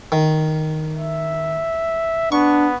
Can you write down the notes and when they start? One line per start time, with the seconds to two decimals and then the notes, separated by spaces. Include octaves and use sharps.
0.12 D#3
0.94 E5
2.32 B3 D4 C#6